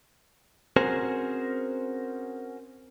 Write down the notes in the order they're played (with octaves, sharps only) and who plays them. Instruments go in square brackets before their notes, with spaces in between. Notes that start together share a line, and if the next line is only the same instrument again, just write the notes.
[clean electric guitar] C4 C#4 F#4 G#4 A#4 C5